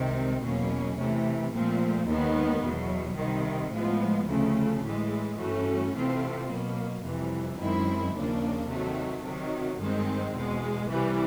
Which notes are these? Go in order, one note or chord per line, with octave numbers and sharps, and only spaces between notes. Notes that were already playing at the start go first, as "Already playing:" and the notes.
Already playing: C2 C3 D#3 G#3 C4
E2 B2 F#3 A#3 C#4
C3 E3 A3
A#2 F3 A3 C4
D#2 D#3 G#3 B3
E2 B2 F#3
C2 C3 D#3
A2 F3 G#3 B3
D2 C#3 F3 A3
A2 E3 G#3
G2 E3 A3 C#4 F#4
C3 E3 A3 C4 F4
B2 F#3 A#3
F2 C3 E3 G3
F#2 D#3 G#3 C4 E4
D#2 C#3 F3 A#3 D4
C3 D#3 F#3 A3
C3 D#3 F#3
G2 D#3 G#3 C4
E2 B2 G#3
C2 C3 E3 G3